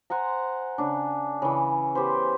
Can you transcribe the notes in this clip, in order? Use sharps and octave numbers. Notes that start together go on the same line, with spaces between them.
C5 F#5 G#5 A#5
C#3 D4
C#3 E3
B3 G4 B4 C5